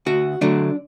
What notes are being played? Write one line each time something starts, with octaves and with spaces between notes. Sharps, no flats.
D2 F#4
D3 F#3 A3 D4